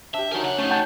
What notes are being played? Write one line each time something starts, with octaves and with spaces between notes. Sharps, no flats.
D4 G4 E5
F#3 D#4 A#4 G#5
C#3 F#5
A3 C#4 D#4 C#5
F#5 G5 A5